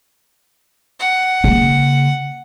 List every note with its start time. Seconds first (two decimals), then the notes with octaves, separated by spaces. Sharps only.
0.99 F#5
1.44 C#3 A#3